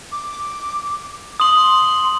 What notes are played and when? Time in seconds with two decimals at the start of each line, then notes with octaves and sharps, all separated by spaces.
0.12 D6
1.40 C6 D#6 F#7